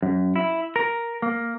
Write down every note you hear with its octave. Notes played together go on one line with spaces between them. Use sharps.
F#2
E4
A#4
A#3